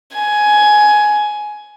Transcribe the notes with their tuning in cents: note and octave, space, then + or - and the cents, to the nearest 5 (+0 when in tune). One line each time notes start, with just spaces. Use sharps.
G#5 +15